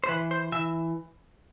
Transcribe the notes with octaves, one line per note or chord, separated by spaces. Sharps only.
C5
E3 B4
C5
E3 E5